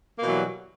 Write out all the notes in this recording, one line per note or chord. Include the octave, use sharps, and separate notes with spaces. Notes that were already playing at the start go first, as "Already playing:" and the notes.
B2 E3 F#3 G3 A#3